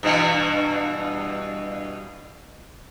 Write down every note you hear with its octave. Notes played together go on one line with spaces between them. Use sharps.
G2 B2 E3